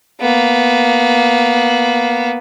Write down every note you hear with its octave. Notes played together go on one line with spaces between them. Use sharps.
A#3 B3